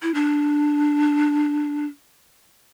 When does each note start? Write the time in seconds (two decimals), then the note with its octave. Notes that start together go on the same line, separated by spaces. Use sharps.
0.02 E4
0.14 D4